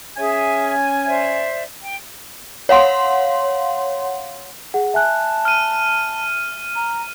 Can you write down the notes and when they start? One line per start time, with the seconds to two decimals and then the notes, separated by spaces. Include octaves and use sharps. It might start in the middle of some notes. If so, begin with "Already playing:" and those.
0.17 C#4 G#4 E5 G#5
1.06 C5 D5 E5
1.82 G5
2.69 C#5 F5 F#5 C6
4.74 G#4 F#5
4.94 E5 G#5 A5 F#6
5.45 F6 D#7
6.75 A#5